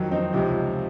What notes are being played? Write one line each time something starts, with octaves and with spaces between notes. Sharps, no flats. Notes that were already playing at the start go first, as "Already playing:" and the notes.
Already playing: F2 D#3 F#3
C4 D#4
C#2 C3 F3